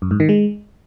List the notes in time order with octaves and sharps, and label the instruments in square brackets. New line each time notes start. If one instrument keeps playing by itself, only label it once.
[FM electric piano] F#2
G#2
D#3
G#3